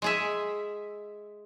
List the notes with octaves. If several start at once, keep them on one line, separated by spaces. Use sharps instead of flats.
G#3 G#4 E5